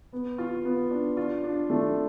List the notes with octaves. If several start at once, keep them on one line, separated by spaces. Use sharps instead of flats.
B3
F4
B3
D4
F4
D4
A3